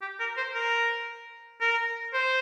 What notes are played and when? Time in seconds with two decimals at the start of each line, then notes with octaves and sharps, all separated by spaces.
0.01 G4
0.20 A#4
0.37 C5
0.55 A#4
1.61 A#4
2.14 C5